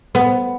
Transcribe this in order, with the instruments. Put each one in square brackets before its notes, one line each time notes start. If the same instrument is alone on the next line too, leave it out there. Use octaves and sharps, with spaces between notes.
[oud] B3